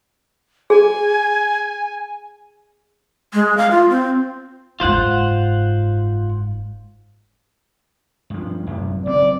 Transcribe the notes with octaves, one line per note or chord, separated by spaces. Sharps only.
G#4 G#5
G#3
F5
F4
C4
F#1 G#2 F4 C5 F#5
G2 F3
A1 F#2 C3
F#1 C4 D5